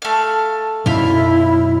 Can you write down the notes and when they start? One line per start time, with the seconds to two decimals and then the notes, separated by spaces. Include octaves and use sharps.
0.02 A3 F5
0.86 B1 F#2 E4 F4 E5 F5